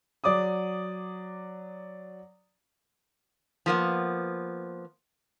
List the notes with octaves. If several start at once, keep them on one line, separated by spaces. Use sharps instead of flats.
F#3 D5 D6 D#6
F3 A#3 B3